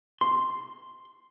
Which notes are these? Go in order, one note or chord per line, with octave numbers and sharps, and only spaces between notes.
C6